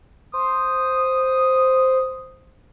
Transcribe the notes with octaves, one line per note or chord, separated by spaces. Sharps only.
C5 D#6